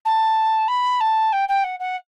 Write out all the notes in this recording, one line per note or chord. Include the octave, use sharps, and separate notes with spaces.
A5
B5
A5
G5
G5
F#5
F#5